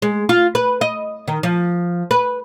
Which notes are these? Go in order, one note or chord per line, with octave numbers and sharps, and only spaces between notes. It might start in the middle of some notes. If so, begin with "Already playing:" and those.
G#3
F4
B4
D#5
D#3
F3
B4